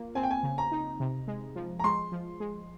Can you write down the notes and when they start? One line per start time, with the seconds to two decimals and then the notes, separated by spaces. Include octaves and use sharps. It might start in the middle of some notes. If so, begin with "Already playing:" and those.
Already playing: A#3 F4
0.15 C4 G#5
0.23 G5
0.31 G#5
0.43 C#3
0.58 A#5
0.72 D#4
1.00 C3
1.28 G#3
1.56 F3
1.79 A#5
1.84 G#3 C6
2.12 F3
2.40 G#3